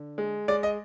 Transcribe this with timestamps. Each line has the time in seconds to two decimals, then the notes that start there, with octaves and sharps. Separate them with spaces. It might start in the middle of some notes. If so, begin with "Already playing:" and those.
Already playing: D3
0.18 G#3
0.48 G#3 D5
0.63 D#5